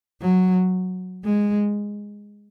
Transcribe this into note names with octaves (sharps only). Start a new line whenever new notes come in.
F#3
G#3